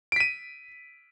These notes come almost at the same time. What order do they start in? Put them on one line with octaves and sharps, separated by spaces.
D7 B6 D#7